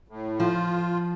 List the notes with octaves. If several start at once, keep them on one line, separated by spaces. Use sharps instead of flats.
A2
F3 F4